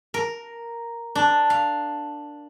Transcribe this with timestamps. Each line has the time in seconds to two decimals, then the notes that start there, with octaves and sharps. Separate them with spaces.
0.14 A#4
1.15 D4
1.50 F5